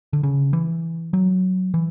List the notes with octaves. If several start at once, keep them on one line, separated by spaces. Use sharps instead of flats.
D3
C#3
E3
F#3
E3